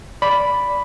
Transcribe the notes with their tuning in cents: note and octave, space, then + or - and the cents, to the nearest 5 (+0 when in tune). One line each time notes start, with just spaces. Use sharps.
D5 -10 B5 +0